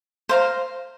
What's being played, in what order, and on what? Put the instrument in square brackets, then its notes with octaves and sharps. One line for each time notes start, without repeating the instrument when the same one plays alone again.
[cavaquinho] C5 F5 A#5